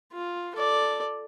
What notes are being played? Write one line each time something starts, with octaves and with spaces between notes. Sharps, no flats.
F4
A4 D5